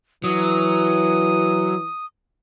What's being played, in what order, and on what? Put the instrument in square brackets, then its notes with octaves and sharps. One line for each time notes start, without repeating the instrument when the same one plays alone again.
[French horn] E3 [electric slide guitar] F#3 [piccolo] D#6